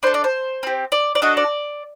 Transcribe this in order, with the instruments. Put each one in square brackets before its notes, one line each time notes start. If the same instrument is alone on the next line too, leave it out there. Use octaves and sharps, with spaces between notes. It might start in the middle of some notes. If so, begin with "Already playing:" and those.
[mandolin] D4 A4 C5
D5
C5
C4 G4
D5
D5
D4 F#4 A4 D#5
D5